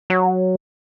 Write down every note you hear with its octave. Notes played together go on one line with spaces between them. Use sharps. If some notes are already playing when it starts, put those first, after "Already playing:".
F#3